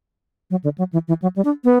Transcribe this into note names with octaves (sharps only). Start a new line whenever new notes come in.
F#3
D3
F#3
E3
E3
F#3
G3
D4
B3